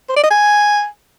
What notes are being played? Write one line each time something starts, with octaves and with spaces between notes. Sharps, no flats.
C5
D5
D#5
G#5